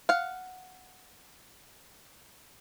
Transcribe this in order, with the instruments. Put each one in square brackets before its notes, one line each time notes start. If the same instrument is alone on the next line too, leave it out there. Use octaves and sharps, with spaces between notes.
[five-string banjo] F5 F#5